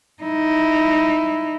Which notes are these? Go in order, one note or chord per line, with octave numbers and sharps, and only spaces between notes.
D#4 E4